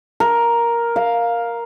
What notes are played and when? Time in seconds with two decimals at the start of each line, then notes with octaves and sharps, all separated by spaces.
0.20 A#4
0.96 F5